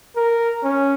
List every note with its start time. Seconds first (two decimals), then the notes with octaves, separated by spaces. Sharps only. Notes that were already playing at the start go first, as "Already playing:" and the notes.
0.16 A#4
0.63 C#4